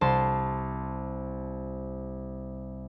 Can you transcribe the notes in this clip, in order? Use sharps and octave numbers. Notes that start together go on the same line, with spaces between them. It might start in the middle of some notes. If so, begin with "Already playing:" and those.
C2 A5 C6